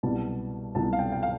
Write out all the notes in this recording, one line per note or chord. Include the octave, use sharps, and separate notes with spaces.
C2 B2 G3 A5
C2 B2 G3 A5
F5
G5
G5
F5